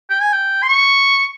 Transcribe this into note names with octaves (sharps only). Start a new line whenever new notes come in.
G5
G#5
G5
C6
C#6